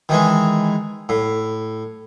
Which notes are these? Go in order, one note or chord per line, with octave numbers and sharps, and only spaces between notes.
D#3 E3 G#3
A2